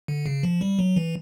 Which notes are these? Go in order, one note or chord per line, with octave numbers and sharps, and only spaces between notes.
D3
C#3
F3
G3
F#3
E3